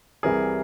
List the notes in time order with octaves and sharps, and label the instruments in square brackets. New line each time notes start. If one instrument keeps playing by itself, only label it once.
[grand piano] C2 C3 E3 G3 G#4 A#4